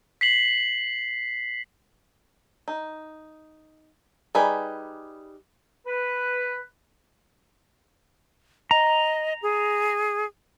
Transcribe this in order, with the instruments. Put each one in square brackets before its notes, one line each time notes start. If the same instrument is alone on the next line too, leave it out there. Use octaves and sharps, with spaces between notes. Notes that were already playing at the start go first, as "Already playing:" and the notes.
[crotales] B6 C7 F#7
[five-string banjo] D#4
G3 D#4 G#4 B4
[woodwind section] B4
[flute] D#5 [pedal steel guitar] A#5
[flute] G#4